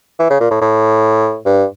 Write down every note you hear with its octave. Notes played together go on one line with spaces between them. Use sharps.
E3
C#3
A#2
A2
A2
G2